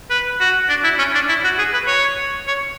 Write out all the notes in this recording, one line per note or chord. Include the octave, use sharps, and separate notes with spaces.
B4
F#4
D4
E4
C#4
D4
E4
F#4
G#4
B4
C#5
C#5